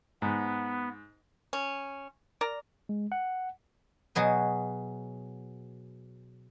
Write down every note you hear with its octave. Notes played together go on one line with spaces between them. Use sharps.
G#2 B3
C#4
A#4 D5 A#5
G#3
F#5
B2 F#3 G#4 B4